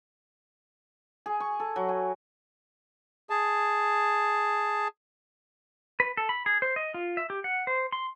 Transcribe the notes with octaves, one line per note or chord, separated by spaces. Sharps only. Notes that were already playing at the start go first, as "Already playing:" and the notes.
G#4
C#6
A4
F#3
G#5
G#4 A5
B4
A4
B5
G#4
C5
D#5
F4
E5
G4
F#5
C5
C6